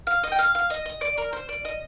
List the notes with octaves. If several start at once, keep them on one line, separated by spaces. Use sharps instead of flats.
F5
D#5
G5
F5
F5
D#5
D#5
D5
A#4
C5
D5
D#5